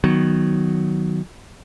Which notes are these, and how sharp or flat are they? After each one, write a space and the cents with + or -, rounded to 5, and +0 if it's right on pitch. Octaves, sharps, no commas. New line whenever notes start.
D#3 +0 F#3 +0 B3 +0